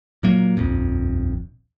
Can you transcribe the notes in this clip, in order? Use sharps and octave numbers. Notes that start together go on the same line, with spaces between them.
A#2 F#3 A#3
D#1 A#1 F2